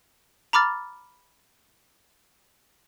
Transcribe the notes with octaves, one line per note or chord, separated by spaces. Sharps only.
A#5 B5 D6 F6 A6